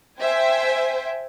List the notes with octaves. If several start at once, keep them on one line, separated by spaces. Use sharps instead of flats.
C5 E5 G5 G#5